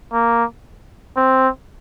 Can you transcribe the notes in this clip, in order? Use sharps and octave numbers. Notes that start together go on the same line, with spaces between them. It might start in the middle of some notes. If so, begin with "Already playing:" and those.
A#3
C4